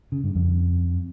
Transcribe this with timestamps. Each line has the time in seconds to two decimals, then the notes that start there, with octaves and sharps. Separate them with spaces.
0.12 C#3
0.24 G2
0.35 F2